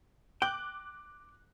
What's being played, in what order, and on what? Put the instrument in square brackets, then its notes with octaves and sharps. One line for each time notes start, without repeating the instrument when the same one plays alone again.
[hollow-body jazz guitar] G5 [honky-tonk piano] D6 F#6 F#7